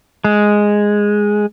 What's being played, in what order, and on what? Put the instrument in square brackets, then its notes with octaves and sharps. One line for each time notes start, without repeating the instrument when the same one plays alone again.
[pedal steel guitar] G#3